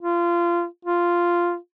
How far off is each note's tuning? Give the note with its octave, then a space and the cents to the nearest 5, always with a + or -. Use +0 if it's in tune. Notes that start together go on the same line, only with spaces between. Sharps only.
F4 -25
F4 -5